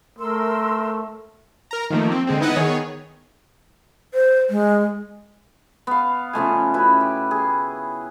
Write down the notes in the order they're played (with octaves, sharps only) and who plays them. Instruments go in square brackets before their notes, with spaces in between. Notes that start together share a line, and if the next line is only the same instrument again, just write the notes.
[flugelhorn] A3 [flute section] A#4 C6 E6
[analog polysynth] A#4 A#5
D#3 F3 A3 A#3
C4
D3 G#3 C4
B3 D#4 E4 B4 D#5 F#5
D#3 B3 G#4 C#5
[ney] C5
G#3
[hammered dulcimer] B3 F5
C#3 F3 A3 G#5
C#4 E4 F#4 B4
G4
G#4